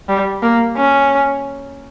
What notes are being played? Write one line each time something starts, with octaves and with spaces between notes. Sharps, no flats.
G3
A#3
C#4